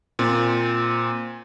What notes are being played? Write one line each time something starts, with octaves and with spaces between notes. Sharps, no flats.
A#2 C4